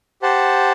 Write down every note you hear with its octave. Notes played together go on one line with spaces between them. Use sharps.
G4 C5 F#5 A5